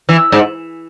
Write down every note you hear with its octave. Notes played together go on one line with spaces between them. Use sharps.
E3
G#2